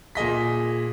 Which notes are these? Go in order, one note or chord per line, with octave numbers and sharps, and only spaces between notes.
A#2 G#4 D#5 B6